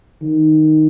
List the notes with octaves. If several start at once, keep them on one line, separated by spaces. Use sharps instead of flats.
D#3